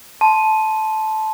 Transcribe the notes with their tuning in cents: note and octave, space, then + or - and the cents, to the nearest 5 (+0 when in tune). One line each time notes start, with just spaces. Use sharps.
A5 -15 C6 +0